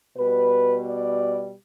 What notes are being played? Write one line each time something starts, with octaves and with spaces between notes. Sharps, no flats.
B2 G3 B4
D5